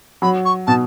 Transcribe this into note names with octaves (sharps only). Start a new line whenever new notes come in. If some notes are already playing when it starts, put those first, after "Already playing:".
F#3 B5
C#6
B2 A5